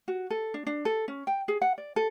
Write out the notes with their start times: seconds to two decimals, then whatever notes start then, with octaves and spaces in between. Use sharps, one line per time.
0.08 F#4
0.30 A4
0.54 D4
0.67 D4
0.85 A4
1.08 C#4
1.27 G5
1.48 G#4
1.62 F#5
1.78 D5
1.96 A4